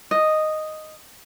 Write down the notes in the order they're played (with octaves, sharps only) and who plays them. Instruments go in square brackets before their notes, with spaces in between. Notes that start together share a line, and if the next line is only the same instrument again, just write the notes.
[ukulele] D#5